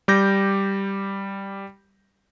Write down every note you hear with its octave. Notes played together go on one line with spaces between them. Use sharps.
G3 D6 G6 A#6